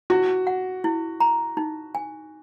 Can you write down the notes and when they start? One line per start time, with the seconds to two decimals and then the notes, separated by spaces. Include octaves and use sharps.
0.10 E4 F#4
0.47 F#5
0.84 E4
1.20 A#5
1.57 D#4
1.95 G#5